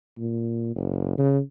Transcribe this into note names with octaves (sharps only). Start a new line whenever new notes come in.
A#2
F#1
C#3